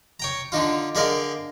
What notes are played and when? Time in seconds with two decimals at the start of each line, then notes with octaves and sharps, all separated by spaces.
0.20 C#5 G5 A#5
0.52 D3 D4 D#4 F4
0.95 D3 G#4 A#4 D5 D#5 F5